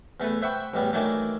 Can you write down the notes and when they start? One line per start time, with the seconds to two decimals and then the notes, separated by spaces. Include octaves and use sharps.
0.20 E2 A3 A4 B4
0.42 C5 E5 F#5 G5 B5 C#6
0.74 A1 E2 G3 B3
0.93 D#3 E3 F#3 A3 A#3 D4